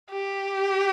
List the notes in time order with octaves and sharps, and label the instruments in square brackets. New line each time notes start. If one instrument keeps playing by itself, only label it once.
[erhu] G4